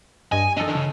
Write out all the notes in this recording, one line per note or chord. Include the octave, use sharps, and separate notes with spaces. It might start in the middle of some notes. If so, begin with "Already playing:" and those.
G2 D#5 G#5
D3 D#3 A4 D#5
C#3